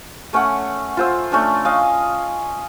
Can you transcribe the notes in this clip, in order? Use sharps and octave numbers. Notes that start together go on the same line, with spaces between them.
A3 C#4 C#5 F#5
F4 C5 E6
A3 C#4 D4
D#5 F5 G#5